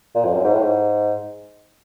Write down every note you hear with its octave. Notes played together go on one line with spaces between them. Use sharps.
A#2
F2
F#2
G#2
A2
G#2